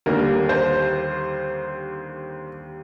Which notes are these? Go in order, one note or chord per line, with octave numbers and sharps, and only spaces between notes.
D#2 D3 G3 A#3 A#4
C5